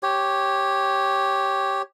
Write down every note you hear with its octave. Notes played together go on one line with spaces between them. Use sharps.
G4 C#5